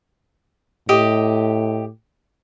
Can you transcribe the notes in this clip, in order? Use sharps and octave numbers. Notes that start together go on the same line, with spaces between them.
A2 G4 D#5